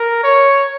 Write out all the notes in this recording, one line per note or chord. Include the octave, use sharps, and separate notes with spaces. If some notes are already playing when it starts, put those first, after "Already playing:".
Already playing: A#4
C#5